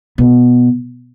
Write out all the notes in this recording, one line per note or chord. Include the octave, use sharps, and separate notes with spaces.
B2